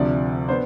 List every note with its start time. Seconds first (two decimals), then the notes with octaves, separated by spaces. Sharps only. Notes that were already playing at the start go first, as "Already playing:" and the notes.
Already playing: D2 C3 F3 D5
0.49 B3 D4 C5